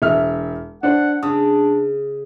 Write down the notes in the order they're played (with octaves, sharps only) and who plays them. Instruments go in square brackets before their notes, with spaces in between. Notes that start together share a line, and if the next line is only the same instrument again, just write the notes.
[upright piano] E1 E5 F6
[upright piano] D4 C5 [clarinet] F#5
[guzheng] C#3 [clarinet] D4 [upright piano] D#6